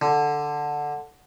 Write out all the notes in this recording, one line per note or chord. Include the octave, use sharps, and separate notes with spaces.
D3